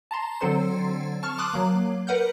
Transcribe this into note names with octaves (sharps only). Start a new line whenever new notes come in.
A5 A#5 C6
D3 F#3 C4 A4 C5 C6
A5 C#6 F6
A5 C6 D6 D#6 F#6
F#3 A#3
A#4 B4 F#5 F6 G6